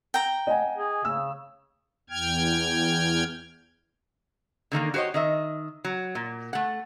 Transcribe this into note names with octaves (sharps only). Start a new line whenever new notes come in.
G5 A#5
D#5 F#5 G#5
G#4
C#3 E6
E2 G5 F6 G#6
D3 D#3 A3 A#3
F#4 G4 C5 C#5 D#5
D#3 D#5 E5
F#3
A#2
A3 F#5